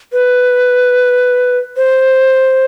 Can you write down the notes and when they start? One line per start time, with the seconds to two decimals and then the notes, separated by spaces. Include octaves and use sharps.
0.12 B4
1.77 C5